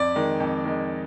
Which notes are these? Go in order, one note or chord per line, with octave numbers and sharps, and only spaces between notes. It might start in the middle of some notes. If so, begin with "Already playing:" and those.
Already playing: F2 D5
D#3 G#3
F2
D#3 G#3